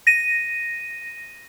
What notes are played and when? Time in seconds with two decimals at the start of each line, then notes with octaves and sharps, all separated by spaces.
0.07 A#6 D#7